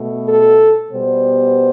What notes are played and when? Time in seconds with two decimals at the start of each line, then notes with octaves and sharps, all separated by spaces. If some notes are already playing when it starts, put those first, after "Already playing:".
Already playing: B2 A3
0.28 A4
0.90 B2 G3 B3 C5